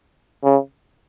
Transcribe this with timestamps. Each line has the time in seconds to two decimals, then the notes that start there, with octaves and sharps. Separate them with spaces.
0.44 C#3